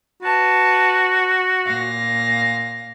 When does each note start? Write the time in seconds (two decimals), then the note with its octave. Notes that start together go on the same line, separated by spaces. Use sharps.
0.23 F#4 B4 A5
1.66 A#2 F5 A#6